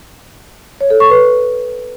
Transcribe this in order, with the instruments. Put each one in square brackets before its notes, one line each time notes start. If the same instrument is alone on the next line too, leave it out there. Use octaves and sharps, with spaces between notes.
[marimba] C#5
A4
C#6
B4